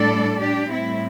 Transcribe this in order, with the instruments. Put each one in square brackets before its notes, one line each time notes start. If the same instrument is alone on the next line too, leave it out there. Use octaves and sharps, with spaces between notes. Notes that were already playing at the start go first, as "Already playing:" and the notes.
Already playing: [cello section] A2 G3 D4 A4 D5
D4 G4
A2 G3 C4 E4